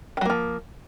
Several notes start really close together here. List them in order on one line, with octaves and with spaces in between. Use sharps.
D#3 F#3 A#3 F3